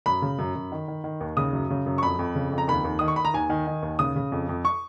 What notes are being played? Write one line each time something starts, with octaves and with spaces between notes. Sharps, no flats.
F#2 B5
C#3
F#2
F#2
D#3
D#3
D#3
D#2
C#3 D#6
F#2
C#3
F#2
C#6
F2 B5
F2
C#3
F2
A#5
D#2 B5
D#2
D#3 D#6
C#6
D#3 B5
A#5
D#2 G#5
D#3
D#3
D#2
C#3 D#6
C#3
F2
F2
C#6